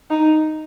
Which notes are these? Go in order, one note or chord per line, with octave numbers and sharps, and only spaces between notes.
D#4